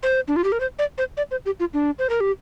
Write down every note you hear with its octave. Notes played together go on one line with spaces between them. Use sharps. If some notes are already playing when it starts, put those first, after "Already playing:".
C5
D4
F4
G4
A#4
C5
D5
C5
D5
C5
G4
F4
D4
C5
A#4
G4